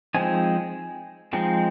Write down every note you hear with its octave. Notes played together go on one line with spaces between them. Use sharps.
F3 G#3 C4 D#4 G#5
F3 G#3 C4 D#4